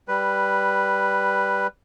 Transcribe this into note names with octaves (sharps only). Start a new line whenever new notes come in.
G3 B4